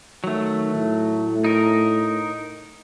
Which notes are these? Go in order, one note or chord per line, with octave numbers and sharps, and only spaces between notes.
D#3 F#3 A3
A2
D#4 A#4